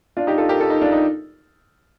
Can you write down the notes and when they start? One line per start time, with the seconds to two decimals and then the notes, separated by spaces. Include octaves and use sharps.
0.17 D4 F4
0.27 D#4 G4
0.38 F4 A4
0.49 G4 A#4
0.60 F4 A4
0.70 D#4
0.82 D4 F4
0.92 D#4